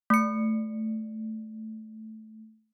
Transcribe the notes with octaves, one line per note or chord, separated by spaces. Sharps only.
A3 C#7